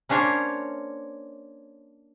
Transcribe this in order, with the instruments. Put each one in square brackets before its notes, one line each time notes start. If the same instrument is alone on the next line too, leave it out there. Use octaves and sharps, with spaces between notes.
[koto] A#3 C#4 D4 C5 C#5 A#5